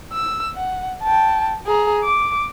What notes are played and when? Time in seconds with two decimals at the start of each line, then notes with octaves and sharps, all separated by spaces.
0.13 E6
0.55 F#5
1.03 G5 A5
1.66 G#4 A#5
2.04 D6